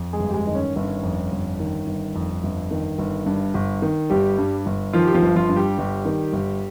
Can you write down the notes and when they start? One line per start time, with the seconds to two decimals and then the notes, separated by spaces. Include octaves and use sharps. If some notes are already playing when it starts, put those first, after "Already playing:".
Already playing: F2
0.13 G#3 G#4
0.20 G1
0.30 G4
0.34 G#3 G#4
0.47 D#3 D#5
0.55 C#4 C#5
0.75 G1 C#4 C#5
1.03 F2
1.32 G1
1.60 D#3
1.87 G1
2.15 F2
2.44 G1
2.71 D#3
2.99 G1
3.26 G2
3.54 G1
3.82 D#3
4.10 G1 G3 G4
4.38 G2
4.66 G1
4.93 D#3 F3 F4
5.06 G4
5.14 F3 F4
5.22 G1
5.36 F3 F4
5.49 G2
5.56 G3 G4
5.78 G1
6.05 D#3
6.33 G1